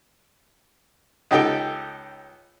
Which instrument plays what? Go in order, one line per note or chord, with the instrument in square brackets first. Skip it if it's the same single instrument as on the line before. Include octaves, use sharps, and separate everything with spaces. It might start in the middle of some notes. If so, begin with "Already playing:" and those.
[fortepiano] C#2 D#4 G4 A4 G5